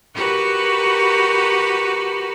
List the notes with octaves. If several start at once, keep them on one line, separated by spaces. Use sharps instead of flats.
F#4 G4 A#4 B4